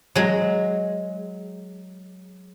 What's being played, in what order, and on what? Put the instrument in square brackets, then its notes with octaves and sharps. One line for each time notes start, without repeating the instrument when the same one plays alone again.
[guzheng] F#3 G#3